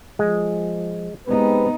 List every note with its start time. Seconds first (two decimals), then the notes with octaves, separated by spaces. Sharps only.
0.19 F3 G#3
1.27 G#3 B3 C4 D#4 G4 B4